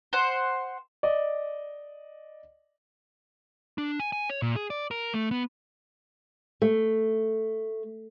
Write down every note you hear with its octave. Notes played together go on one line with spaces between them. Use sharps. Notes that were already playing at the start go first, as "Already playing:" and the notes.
C5 F#5
D5 D#5
D4
G#5
G#5
C#5
A#2
G#4
D5
A#4
A3
B3
A3